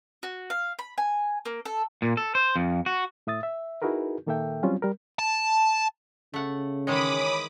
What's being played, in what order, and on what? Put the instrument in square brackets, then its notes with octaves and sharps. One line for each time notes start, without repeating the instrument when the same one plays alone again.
[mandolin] F#4
F5
B5
G#5
A#3
A4
[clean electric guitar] A#2
A4
C5
F2
F#4
[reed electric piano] A2 E5 D#6 A6
E5
D#4 E4 F#4 G#4 A#4 B4
A#2 D#3 A#3 A4 E5 G5
F#3 G3 C4 C#4 F4
G3 A#4
[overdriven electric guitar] A5
[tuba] C#3 [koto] A3 F#5
[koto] D#3 E3 G#3 [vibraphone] C#5 G#5 [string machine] B5 D6 D#6